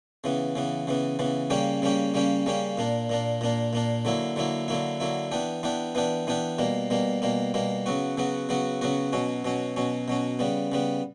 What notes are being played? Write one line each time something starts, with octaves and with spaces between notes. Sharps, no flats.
C#3 E3 B3
C#3 E3 B3
C#3 E3 B3
C#3 E3 B3
C#3 G3 A#3 C#4 G4
C#3 G3 A#3 C#4 G4
C#3 G3 A#3 C#4 G4
C#3 G3 A#3 C#4 G4
A#2 A#3 D4
A#2 A#3 D4
A#2 A#3 D4
A#2 A#3 D4
D3 F#3 A#3 E4
D3 F#3 A#3 E4
D3 F#3 A#3 E4
D3 F#3 A#3 E4
E3 B3 D4 G4
E3 B3 D4 G4
E3 B3 D4 G4
E3 B3 D4 G4
B2 G3 A#3
B2 G3 A#3
B2 G3 A#3
B2 G3 A#3
C#3 F#3 B3 F#4
C#3 F#3 B3 F#4
C#3 F#3 B3 F#4
C#3 F#3 B3 F#4
B2 F#3 C#4
B2 F#3 C#4
B2 F#3 C#4
B2 F#3 C#4
C#3 G3 B3
C#3 G3 B3